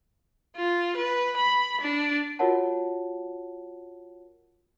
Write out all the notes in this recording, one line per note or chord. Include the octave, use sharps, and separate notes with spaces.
F4
B4
B5
D4
F4 F#4 A#4 C#5 F#5 A5